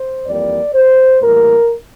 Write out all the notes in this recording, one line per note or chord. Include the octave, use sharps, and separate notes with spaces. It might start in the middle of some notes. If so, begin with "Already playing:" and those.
Already playing: C5
F2 E3 G3 A#3 D5
C5
A2 E3 G3 A#3 A#4